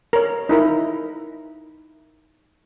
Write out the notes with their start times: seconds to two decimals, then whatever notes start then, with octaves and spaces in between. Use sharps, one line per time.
0.13 A#4 C#5
0.49 D#4 E4 A#4